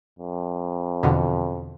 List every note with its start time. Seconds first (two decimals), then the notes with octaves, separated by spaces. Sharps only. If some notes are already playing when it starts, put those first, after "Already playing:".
0.19 F2
1.03 E2 B2 D3